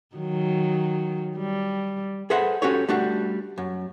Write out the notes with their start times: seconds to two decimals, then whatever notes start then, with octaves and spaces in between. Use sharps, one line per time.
0.16 D#3 F#3
1.38 G3
2.30 G#4 A4 B4 C5 E5 F#5
2.62 C#4 F#4 G4 A4 C#5
2.89 G3 A3 D4 F#4
3.58 F#2